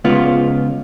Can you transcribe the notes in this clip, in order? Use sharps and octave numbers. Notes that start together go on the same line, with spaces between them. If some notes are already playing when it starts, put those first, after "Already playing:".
C#2 B3 F4